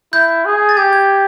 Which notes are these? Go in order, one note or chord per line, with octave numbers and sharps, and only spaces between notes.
E4 G6
G#4
A6
G4 G#6
G#6